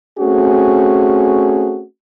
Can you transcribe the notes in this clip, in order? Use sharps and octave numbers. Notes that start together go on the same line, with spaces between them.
A3 C4 C#4 F#4 G#4